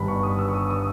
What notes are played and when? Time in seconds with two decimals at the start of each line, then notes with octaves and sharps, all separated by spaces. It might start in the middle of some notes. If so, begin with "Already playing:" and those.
Already playing: G1 G2 D#3 B5
0.08 C#6
0.23 D#6
0.39 E6
0.48 C#6
0.54 D#6
0.70 D#6